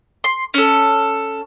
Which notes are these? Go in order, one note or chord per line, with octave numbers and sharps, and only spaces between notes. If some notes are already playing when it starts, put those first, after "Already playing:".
C6
C#4 A4